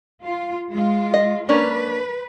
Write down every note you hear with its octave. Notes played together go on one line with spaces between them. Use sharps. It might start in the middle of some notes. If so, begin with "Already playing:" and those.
F4
G#3 F4
D#5
A#3 C#4 D4 B4